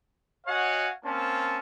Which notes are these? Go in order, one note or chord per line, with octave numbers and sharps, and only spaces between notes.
F#4 C#5 D#5 F5 F#5 G#5
A#3 C4 C#4 A5